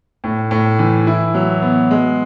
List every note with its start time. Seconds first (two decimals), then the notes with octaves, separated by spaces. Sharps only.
0.24 A2
0.51 A2
0.79 E3
1.07 E4
1.34 F#3
1.62 B3
1.91 G#3